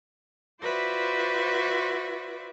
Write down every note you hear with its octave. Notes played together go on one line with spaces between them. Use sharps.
F4 F#4 B4 C5 D5 E5